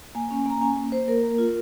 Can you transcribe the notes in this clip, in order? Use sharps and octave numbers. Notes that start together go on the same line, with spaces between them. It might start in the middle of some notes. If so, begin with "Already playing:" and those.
A#3 G#5
C#4
A#3 A#5
C#4 G#5
A#3
A#3 C5
A#3 A#4
A#3
F4